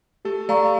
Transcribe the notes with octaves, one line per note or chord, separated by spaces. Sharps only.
A3 G4 A4
A3 A4 D5 F5 A#5 C#6